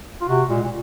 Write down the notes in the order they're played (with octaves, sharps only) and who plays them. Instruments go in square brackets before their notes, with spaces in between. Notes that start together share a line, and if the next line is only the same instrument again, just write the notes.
[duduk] F4
[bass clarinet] C3 [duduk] F#4
[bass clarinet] A#2 [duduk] G#3
[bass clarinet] A#2